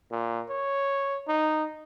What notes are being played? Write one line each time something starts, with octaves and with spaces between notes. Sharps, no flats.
A#2
C#5
D#4